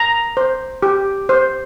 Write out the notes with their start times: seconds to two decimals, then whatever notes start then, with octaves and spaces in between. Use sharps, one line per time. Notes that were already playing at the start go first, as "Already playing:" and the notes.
Already playing: A#5
0.37 C5
0.82 G4
1.29 C5